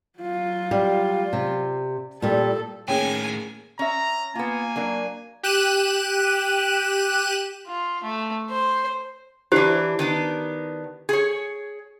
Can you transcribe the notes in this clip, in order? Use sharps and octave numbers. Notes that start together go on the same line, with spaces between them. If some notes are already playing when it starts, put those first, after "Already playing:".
F#3 F4
G3
C3
A#2 G3 A4
A2 D#3 A#3 C#4 G#4 C#5 G5 G#5
C#4 E5 A#5
A#3 B3 F4 G#5
F#3 D4 A#4
G4 F#6 D#7 E7
F4
A3
C5
E3 D4 E4 G4 C5
D#3 B3 D4
G#4 C#5